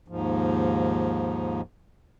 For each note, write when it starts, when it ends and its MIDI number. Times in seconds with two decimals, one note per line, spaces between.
0.08 1.61 39
0.08 1.61 44
0.08 1.61 53